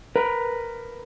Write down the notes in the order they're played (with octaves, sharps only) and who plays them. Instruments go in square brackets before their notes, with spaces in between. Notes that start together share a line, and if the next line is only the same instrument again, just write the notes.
[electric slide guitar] A#4 B4